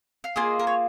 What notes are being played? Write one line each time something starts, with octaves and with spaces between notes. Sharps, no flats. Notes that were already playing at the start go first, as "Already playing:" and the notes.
F5
A#3 F4 G#4 D#5
A#4
C#5